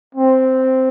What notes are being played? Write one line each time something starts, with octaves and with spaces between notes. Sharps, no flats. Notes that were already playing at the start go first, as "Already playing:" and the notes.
C4